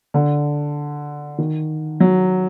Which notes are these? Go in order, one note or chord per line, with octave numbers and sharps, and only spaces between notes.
D3
D#3
F#3